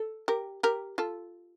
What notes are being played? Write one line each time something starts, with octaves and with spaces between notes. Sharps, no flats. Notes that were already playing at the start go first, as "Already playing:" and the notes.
Already playing: A4
G4 A#4
G4 A#4
F4 A4